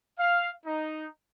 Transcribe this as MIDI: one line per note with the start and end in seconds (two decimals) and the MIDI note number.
0.18 0.50 77
0.65 1.06 63